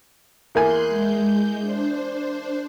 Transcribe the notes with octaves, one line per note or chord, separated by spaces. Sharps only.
E2 A#3 G#5 C6 F#6 G6
G#3 G6
D4 C5